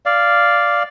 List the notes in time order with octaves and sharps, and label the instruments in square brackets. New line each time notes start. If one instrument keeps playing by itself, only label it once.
[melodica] D5 F5